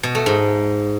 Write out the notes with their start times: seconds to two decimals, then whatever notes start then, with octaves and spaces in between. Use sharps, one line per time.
0.03 B2
0.15 A3
0.26 G#2